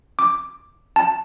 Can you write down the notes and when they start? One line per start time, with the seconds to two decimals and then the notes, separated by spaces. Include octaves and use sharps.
0.19 D6
0.96 A5